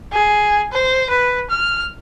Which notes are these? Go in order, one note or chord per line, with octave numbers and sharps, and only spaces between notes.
G#4
C5
B4
F6